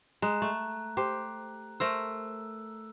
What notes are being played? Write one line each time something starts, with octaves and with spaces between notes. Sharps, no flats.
G#3 A#5 F#6
A3
G4 C5
A3 A#4 C5 E6